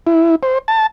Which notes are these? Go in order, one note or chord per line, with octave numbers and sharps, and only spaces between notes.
E4
C5
A5